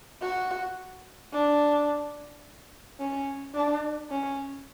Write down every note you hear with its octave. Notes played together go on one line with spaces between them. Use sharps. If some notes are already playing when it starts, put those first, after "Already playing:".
F#4
D4
C#4
D4
C#4